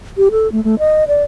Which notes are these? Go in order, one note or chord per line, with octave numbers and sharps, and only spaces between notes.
G4
A4
A3
A3
D#5
D5